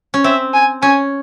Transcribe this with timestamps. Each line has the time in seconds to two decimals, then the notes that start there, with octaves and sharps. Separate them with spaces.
0.14 C#4
0.24 C4 E5
0.54 G#5
0.82 C#4 G#5